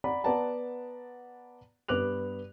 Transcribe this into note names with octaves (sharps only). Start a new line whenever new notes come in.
D5 F#5 A#5 B5
B3 B4 D5 F#5 A5 A#5
G2 B3 B4 D6 F#6 F7